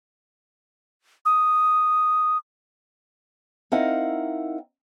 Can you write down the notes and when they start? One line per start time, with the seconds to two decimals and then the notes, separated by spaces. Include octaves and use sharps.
1.26 D#6
3.72 C4 D#4 E4 A#4 F5 F#5